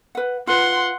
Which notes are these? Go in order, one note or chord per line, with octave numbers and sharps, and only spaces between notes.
B4 F#5
F4 B4 F#5 C6